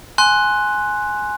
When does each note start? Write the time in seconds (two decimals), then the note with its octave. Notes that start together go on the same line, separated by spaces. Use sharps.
0.18 G#5 C6 F#6